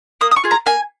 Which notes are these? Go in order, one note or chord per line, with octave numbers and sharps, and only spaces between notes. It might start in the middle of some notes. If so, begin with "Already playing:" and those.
A#3 D#6
D#6
C#6
F4 G#4
A#5
A#3 G#5